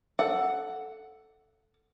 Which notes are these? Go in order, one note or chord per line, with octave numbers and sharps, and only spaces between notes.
A4 F#5